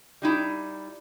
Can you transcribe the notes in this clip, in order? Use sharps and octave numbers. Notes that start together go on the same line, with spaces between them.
G3 D#4 E4